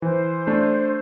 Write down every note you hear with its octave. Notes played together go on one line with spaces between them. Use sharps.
E3 C5
A3 D4